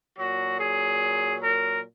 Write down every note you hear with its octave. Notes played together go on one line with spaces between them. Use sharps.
A#2 F#3 F#4
G#4
A#4